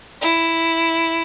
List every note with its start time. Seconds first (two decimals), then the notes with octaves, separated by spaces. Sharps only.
0.22 E4